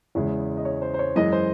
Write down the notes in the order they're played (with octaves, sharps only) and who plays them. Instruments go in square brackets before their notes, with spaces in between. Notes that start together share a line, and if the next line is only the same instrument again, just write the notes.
[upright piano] E2 C#3 G#3 E4
D#5
C#5
C5
C5
C#5
F#2 E3 G#3 D#5
C5